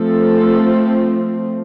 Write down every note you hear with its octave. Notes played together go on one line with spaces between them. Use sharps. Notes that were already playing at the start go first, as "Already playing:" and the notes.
Already playing: F3 A3 C4 A4